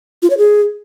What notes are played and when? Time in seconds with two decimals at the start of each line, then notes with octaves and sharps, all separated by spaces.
0.22 F4
0.30 C#5
0.38 G#4